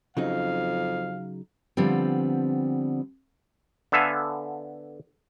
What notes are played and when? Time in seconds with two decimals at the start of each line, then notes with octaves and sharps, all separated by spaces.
0.17 F2 C#3 F#3 D#4 F5
1.77 D3 F3 G3 B3 C4
3.92 D3 B3 A4 E5 F5 G#5